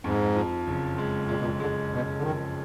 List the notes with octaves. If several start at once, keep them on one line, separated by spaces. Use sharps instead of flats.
F2 G#2
F3
F#1
G#3
A#2 G#3
B2
A#2
D3 G#3
F#1 B2
D3
D#3 F3